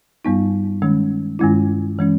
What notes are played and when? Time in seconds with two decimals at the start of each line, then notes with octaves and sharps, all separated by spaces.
0.25 G2 G3 B3 D#4
0.82 D#3 G#3 C#4
1.39 G2 D#3 G#3 C#4 E4
1.99 E3 G#3 C#4